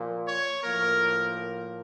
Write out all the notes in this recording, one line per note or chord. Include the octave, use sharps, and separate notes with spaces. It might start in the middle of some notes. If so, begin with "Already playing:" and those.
Already playing: A#2 F3 A#3
C#5
A2 F3 A#3 A#4